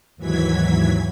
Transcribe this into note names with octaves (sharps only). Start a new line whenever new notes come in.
D#2 G#2 E3 F#3 G#6 B6